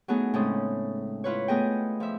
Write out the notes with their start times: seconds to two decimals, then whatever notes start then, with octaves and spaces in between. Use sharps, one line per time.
0.08 F#3 A3 B3 D#4 E4 G#4
0.34 A2 C#3 G#3 C4 C#4 D#6
1.24 E4 F4 B4 C#5
1.48 A3 B3 G#4 D#5 G5
2.00 F3 E5